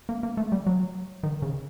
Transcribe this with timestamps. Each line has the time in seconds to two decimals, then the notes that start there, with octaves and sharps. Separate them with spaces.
0.09 A#3
0.23 A#3
0.37 A3
0.52 G3
0.66 F#3
1.23 D#3
1.42 C#3